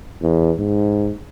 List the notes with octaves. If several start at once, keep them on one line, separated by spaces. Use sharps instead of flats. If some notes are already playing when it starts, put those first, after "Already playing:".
E2
G#2